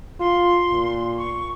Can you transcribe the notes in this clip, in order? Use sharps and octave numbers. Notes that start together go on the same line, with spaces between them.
F4 C6
A#2
C#6